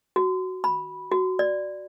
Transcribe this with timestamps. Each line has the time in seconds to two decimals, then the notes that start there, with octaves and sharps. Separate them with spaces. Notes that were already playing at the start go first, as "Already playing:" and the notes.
0.16 F#4
0.64 B5
1.12 F#4
1.39 D5